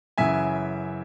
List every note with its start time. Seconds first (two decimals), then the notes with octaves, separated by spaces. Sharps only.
0.18 F#2 C#3 E3 E5 G#5